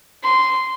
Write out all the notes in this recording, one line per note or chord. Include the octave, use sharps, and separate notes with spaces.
C6